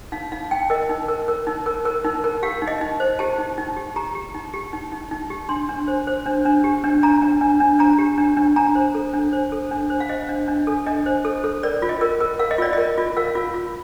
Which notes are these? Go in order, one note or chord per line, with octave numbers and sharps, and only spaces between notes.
D#4 F5
D#4 F5
D#4 G5
A#4 D#5
D#4
A#4
A#4
D#4
A#4
A#4
D#4
A#4
G4 F5
D#4
D#5
D#4
C5
G4 A5
D#4
D#4
G4
G4 A#5
G4
D#4
G4
D#4
D#4
D#4
G4
D4 C6
D4
C5
C5
D4
D4
G4
D4
D4 A#5
D4
D4
D4
D4 A#5
G4
D4
D4
D4 A#5
C5
A4
D4
C5
A4
D4
C5
F5
C5 D#5
D4
D4
A4
D4 D#5
C5
A4
A4
A#4 D5
F4
D#5
A#4
A#4
A#4 F5
D#5
F4 D5
A#4 D#5
F4
A#4 F5
F4
F4